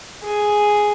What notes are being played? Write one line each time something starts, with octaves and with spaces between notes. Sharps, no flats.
G#4